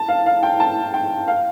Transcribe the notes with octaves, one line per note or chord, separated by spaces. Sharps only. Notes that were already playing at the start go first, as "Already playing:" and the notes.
Already playing: A5
F5
F5
G5
A5
G5
F5